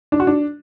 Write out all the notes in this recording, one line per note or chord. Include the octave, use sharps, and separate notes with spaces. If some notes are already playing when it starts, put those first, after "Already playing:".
D4
F#4
D4